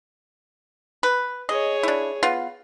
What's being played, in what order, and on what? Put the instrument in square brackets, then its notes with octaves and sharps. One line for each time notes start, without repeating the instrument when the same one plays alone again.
[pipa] B4
[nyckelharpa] G#4 C#5 [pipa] D#5
[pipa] D4 E4
B3 F4